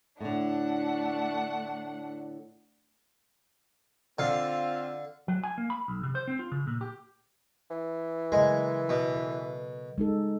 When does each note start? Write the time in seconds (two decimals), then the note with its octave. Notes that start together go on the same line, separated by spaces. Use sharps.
0.20 A2 D3 A3 D4 F#5
4.19 D3 C4 F4 F5
5.28 F#3
5.44 G#5
5.58 A#3
5.70 B5
5.88 B1
6.03 C3
6.15 C5
6.28 C4
6.39 F4
6.52 C#3
6.67 A#2
6.81 G4
7.71 E3
8.32 C#3 F#3 G#3 A#4
8.89 B2
9.16 A4
9.98 G#3 D#4 A4